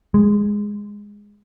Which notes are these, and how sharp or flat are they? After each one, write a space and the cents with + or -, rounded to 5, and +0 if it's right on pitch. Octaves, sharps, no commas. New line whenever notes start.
G#3 -10